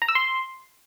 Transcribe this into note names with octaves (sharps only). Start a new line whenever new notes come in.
A#5
E6
C6